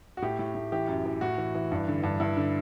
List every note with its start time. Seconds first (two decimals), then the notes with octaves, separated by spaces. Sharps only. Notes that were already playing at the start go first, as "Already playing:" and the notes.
0.17 F#4
0.22 A2 G4
0.39 A2
0.55 A2
0.72 E3 G4
0.88 F#2
1.05 E3
1.21 A2 F#4
1.38 E3
1.55 E3
1.72 G2
1.88 D3
2.03 G2
2.20 G2 E4
2.37 D3